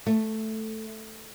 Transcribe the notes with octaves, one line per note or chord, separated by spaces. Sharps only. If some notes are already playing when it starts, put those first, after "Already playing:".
A3